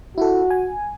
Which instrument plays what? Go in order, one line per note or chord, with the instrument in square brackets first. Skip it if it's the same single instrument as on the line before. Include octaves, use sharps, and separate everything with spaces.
[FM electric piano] E4 A4 [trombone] F#4
[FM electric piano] G#5